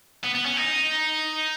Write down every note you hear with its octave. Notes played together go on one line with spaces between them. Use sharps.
B3
B3
C#4
D#4